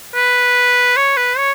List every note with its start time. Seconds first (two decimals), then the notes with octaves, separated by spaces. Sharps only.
0.15 B4
0.97 C#5
1.17 B4
1.37 C#5